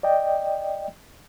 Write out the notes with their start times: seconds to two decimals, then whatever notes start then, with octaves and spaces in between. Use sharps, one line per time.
0.03 D5 D#5 G5